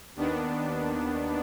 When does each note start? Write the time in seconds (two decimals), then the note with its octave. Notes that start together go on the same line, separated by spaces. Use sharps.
0.15 D#2 D#3 B3 D4